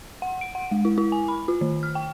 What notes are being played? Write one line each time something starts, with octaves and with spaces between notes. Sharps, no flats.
F#5
D7
F#5
G#3
E4
E4
G#5
B5
F4
D#3
F6
G5